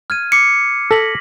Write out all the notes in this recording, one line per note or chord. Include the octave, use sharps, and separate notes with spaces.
F6 G#6 D#7
D6 C7 C#7
A4 A#6 B6 F#7